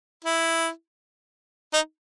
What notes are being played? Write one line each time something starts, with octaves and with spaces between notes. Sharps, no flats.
E4
D#4